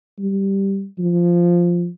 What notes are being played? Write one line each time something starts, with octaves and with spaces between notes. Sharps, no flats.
G3
F3